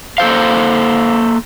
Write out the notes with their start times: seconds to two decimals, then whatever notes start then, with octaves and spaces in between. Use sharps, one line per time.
0.18 A#3 A4 C5 F5